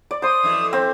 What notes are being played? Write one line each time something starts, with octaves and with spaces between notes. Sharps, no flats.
D5
C5 C6 D#6
F2 E3 A3
C4